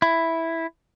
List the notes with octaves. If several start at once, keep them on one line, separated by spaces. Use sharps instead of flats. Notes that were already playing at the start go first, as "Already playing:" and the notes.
E4